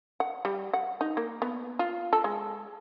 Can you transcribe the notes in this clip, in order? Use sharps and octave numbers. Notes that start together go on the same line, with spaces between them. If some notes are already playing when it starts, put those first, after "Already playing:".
F#5
G3
F#5
D#4
A#3
B3
F4
A4
G#3